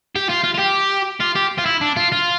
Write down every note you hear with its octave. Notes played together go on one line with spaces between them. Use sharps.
G4
F4
F4
F4
G4
F4
G4
F4
E4
D4
F4
F4